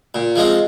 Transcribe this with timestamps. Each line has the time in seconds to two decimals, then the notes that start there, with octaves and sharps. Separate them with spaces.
0.15 A#2
0.36 F3 G#3 C4